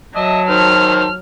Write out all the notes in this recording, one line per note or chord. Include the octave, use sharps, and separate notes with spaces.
F#3 D#5 E5 A5
D#3 C5 F6